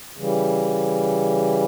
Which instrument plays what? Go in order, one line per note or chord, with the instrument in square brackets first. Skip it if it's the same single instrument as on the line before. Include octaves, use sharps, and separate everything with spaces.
[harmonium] C#3 E3 G3